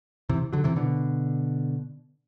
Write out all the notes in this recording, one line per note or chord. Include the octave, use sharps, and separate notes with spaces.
C3 E3
D3 F#3
C3 E3
B2 D3